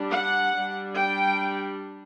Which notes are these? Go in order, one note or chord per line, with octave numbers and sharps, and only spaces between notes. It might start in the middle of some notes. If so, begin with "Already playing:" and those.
Already playing: G3 D4
F#5
G3 D4
G5